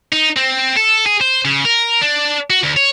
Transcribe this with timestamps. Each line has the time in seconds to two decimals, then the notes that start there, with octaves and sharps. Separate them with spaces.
0.12 D#4
0.37 C4
0.77 A4
1.06 G#4
1.21 C5
1.45 C#3
1.65 A#4
2.02 D4
2.50 F#4
2.63 D2
2.76 C#5